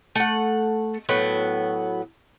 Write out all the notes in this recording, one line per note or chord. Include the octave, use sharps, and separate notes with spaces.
A3 F#5
A2 F#3 B3